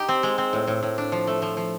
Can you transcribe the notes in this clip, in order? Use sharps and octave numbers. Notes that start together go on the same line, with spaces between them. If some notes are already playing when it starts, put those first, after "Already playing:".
Already playing: D#4 G4
C4
G#3
C4
A2
A2
A2
D4
F3
A3
F3
F3